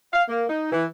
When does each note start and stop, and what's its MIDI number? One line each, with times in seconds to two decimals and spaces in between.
0.13 0.22 77
0.28 0.44 58
0.49 0.69 63
0.72 0.85 52